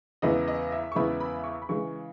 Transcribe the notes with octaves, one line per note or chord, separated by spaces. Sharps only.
E2 C#3 G#3 B3 E4 D#5
D#5
E5
C#6
E2 C#3 G#3 B3 E4 B5
B5
C#6
B5
C#3 E3 G#3 C#6